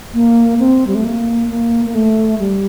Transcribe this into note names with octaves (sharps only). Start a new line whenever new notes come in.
A#3
C4
G3
A3
A#3
A#3
A#3
A3
G3